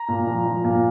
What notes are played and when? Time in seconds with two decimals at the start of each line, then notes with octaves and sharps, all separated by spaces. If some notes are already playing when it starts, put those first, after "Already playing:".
Already playing: A#5
0.08 A#2
0.27 F3
0.46 F3
0.64 A#2